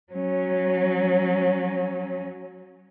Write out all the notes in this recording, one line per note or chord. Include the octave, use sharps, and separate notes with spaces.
F#3 C#4